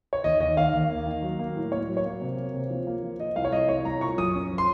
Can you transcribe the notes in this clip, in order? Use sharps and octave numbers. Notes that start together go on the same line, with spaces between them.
C#5
D#2 D#5
D#2 D#5
D#2 F5
D#2
A#3
D#3
F#3
A#3
A2
A#3 C#5
F#3
C#5
A#3
C3
A#3
C3
F3
A#3
F3
F3 D#5
C2 F5
C#5
C2 D#5
C2 C#5
C2 A#5
A#2 C#6
F#2 D#6
C#4
F3
C6